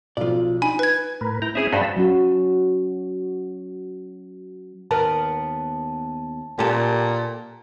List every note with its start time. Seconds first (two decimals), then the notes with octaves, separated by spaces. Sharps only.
0.17 B1 F3 F4 D5
0.62 D#4 G#5 B5
0.79 B4 G#6
1.21 A2 A#4 B4
1.42 E4 G5 A#5
1.55 C4 C#4 E4 G#4 E5 D#6
1.72 G2 F#4 C5 A5 B5 E6
1.96 F#3 C#4 F#4
4.91 D#2 B3 A#4 A5
6.59 A#2 G4 A4